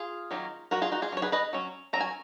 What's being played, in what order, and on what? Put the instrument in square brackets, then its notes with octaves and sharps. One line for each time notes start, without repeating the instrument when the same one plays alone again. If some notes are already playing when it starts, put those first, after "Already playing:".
Already playing: [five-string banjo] F4 G#4
D#3 F#3 A#3 C#4
F#3 C#4 F#4 A#4
F4 G#4
D#4 F#4
F4 G#4
F#3 C#4 C#5
G#4 B4
B4 D#5
F#3 C#4
F#3 C#4 A#5
G#5